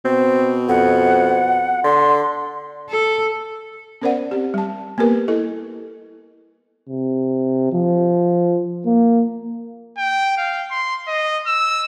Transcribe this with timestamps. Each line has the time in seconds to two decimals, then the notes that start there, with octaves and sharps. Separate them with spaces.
0.05 B2 C4
0.69 F2 F#5
1.84 D3 C6
2.89 A4
4.02 B3 C#4 A#4 C5 D5 F#5
4.31 C4 G4
4.54 G3 A5
4.98 A#3 B3 G4 A#4 B4
5.28 E4 A4 D#5
6.89 C3
7.73 F3
8.85 A#3
9.98 G5
10.37 F5
10.70 C6
11.08 D#5
11.47 E6